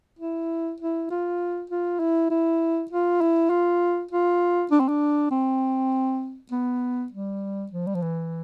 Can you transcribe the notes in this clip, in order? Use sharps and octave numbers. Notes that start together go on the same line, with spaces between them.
E4
E4
F4
F4
E4
E4
F4
E4
F4
F4
D4
C4
D4
C4
B3
G3
F3
G3
F3
E3